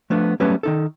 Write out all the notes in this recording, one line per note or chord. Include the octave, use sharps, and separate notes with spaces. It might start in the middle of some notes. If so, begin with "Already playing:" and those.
F3 A3 B3 D4
F#3 G3 A3 B3 C#4 B4
D#3 D#4 A4